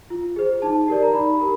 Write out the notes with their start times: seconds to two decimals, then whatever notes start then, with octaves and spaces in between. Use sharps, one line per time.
0.10 F4
0.36 G#4 C5
0.62 D#4 A5
0.88 G4 A#4 D5
1.03 A#5
1.13 D#4 B5
1.39 G4 A#4